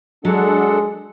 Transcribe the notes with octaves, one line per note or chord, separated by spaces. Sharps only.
F#3 G#3 D4 A4 F#5